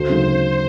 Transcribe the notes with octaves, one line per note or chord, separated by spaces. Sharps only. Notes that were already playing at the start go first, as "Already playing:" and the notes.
Already playing: D2 C5
C#3 F#3 A#3 D#4